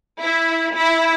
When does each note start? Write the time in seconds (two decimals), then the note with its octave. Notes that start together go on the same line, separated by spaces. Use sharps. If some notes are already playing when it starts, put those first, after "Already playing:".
0.21 E4
0.75 E4